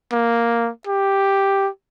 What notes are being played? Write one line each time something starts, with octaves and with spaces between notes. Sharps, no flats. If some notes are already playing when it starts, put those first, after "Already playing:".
A#3
G4